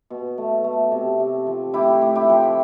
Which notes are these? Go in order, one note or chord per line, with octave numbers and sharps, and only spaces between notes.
B2
A3
A3
C3
C3
F3
A2 E4 G4
A2
E4 G4
F3